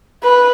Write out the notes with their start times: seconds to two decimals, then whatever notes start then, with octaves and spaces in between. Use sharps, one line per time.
0.23 B4